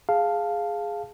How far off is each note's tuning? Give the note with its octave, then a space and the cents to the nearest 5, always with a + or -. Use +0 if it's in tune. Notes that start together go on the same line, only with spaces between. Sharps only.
G#4 +0 F5 +0 A5 +0